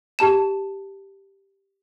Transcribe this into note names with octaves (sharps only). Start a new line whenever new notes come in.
G4 A5 E7